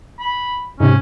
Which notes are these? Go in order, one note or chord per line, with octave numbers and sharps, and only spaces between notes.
B5
G#2 C3 C#4